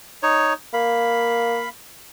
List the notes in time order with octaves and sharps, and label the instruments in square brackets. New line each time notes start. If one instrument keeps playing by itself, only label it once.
[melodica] D#4 C#5
[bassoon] A#3 [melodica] F5 B5